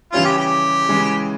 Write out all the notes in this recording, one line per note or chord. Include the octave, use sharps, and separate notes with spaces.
C#3 E3 G3 C#4 E4 F4
G4
G4
C#3 E3 G#3